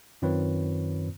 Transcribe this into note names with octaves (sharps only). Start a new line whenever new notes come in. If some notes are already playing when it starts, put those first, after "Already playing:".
F#2 D#3 C4 F4 B4 C#5